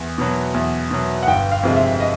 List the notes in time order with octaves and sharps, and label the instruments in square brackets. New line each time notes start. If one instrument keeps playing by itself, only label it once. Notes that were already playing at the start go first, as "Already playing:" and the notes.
Already playing: [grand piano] E2
B2 F#3
E2
B2 F#3
F#5
G1 G5
F5
F2 C3 F3 G#3
E5
D#5